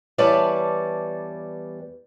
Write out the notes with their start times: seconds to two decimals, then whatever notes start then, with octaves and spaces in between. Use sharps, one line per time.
0.18 E2 G3 B4 C#5 D5 A5